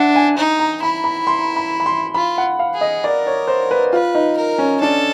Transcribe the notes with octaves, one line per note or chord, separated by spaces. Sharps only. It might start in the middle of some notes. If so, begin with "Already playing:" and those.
Already playing: D4 E5 F#5
G#5
D#4
A#5
E4 B5
B5
C6
B5
B5
C6
F4 B5
F#5
F5
G#4
D#5
A#4 D5
C#5
C5
B4
F4 B4
D#4
A#4
C#4
D4 A4